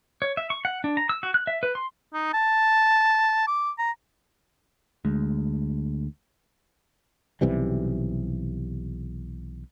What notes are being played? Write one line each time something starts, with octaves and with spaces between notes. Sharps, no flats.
C#5
E5
C#6
F#5
D4
A#5
E6
F#4
F#6
E5
B4
C6
D#4
A5
D6
A#5
D2 G#3
B1 C3 E3 G3